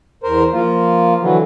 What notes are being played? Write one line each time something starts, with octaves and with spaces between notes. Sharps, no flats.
E2 A#4 C5
F3 A#3 F4
D3 E3 F#3